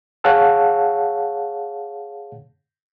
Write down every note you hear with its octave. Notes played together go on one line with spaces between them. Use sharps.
G#4 C#5 F5 F#5 A5 E6